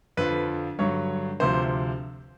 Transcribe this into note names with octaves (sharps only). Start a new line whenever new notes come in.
F2 D3 F3 B4
G2 D3 F#3 C#5
D2 C3 F3 C5